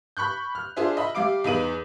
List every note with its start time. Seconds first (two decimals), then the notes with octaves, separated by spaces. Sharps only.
0.17 B5 C#6 F#6 G6
0.55 F6
0.77 D4 F4 G#4 C5 E5
0.97 D#5 E5 B5
1.15 G3 E5 F5 D6 D7
1.44 E2 D#4 B4 D#7 F#7